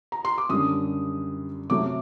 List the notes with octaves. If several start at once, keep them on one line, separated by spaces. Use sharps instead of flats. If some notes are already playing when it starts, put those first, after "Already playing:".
A#5
C6
D6
F#2 D3 G3 D#6
C3 F#3 A3 D6